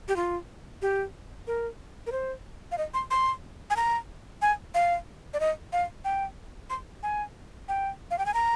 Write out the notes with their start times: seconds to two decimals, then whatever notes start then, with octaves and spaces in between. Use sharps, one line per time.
0.08 G4
0.16 F4
0.82 G4
1.47 A#4
2.06 A#4
2.12 C5
2.72 F5
2.78 D#5
2.94 C6
3.11 C6
3.70 G#5
3.76 A#5
4.42 G#5
4.74 F5
5.34 D5
5.40 D#5
5.73 F5
6.05 G5
6.70 C6
7.03 G#5
7.68 G5
8.11 F5
8.18 G5
8.26 G#5
8.34 A#5